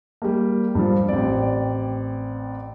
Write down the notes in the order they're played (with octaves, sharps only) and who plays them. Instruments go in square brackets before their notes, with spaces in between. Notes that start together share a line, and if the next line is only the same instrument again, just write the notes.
[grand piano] G3 A#3
G2 F3
A1 C4 D5